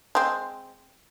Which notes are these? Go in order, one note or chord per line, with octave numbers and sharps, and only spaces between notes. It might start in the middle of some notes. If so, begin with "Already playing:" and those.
G#3 C4